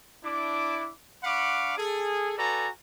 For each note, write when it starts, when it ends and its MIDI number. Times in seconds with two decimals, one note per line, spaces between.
0.24 0.91 62
0.24 0.91 64
0.24 0.91 86
1.24 1.78 62
1.24 1.78 77
1.24 1.78 78
1.24 1.78 83
1.24 1.78 85
1.24 1.78 86
1.78 2.34 68
1.78 2.34 69
2.38 2.68 66
2.38 2.68 69
2.38 2.68 71
2.38 2.68 74
2.38 2.68 80
2.38 2.68 82